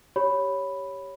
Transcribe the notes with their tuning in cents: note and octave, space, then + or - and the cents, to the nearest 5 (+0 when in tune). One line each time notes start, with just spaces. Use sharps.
G4 +0 C#5 +0 B5 +0